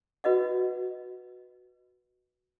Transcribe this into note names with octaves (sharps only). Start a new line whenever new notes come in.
F#4 B4 D#5 F#5